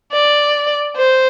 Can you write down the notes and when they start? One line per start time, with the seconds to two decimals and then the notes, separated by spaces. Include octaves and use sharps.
0.13 D5
0.96 C5